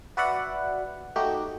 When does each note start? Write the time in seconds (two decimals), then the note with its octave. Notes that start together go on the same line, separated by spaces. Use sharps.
0.17 F#4 B4 D5 E5 F#5
1.16 A3 D#4 F#4 G4